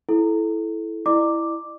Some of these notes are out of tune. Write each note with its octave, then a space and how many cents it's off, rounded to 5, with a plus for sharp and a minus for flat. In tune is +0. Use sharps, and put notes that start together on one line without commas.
E4 +0 A4 -20
E4 +0 D5 +40 D6 +0